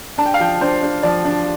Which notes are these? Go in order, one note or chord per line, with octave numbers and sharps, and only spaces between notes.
D4 A5
G5
F5
F3 G5
D4 C5
D4
F3 D5
D4